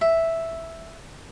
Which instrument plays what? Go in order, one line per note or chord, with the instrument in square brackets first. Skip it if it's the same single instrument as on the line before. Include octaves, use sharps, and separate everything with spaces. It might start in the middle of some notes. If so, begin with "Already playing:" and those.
[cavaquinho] E5